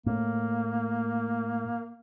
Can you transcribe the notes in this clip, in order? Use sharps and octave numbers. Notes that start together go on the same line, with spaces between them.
A2 A#3